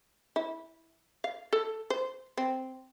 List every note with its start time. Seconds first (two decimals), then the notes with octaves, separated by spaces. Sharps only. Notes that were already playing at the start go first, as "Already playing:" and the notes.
0.36 E4
1.24 F5
1.53 A4
1.90 C5
2.37 C4